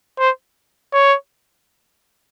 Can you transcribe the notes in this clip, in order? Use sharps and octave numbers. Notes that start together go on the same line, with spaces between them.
C5
C#5